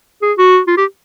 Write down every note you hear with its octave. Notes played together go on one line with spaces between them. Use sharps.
G#4
F#4
F4
G4